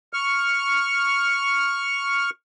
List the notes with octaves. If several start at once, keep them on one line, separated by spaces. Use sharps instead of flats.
C#6 F6